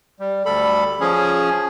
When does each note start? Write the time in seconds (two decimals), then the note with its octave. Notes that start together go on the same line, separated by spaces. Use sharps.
0.20 G3
0.46 D2 G3 A4 B5
1.00 F3 C#4 G#4